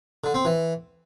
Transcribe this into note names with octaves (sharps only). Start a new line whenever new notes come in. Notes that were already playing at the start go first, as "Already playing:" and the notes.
D3
C4
E3